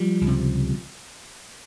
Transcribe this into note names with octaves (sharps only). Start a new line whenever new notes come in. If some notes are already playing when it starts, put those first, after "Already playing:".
Already playing: F3 G3
C#2
C3